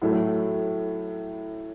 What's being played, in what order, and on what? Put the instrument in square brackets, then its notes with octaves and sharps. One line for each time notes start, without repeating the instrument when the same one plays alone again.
[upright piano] A2 F#3 A3